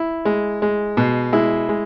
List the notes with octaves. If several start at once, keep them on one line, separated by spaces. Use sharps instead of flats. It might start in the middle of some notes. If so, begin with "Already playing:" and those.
Already playing: E4
G#3
G#3
B2
G#3 E4
G#3